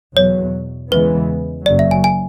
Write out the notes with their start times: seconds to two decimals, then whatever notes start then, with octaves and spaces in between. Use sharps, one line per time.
0.17 E2 B2 F#3 C#5
0.91 E2 C#3 E3 G#3 B3 B4
1.66 F#1 F#2 C#3 F#3 D5
1.79 E5
1.91 G#5
2.04 G#5